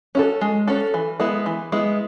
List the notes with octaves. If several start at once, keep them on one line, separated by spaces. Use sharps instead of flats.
C#4 F#4 A4
G#3
C#4 F#4 A4
E3
G#3 B3 E4
E3
G#3 B3 E4